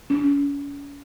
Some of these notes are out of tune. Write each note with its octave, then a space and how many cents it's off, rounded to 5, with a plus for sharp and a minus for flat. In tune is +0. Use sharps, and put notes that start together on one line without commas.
C#4 +40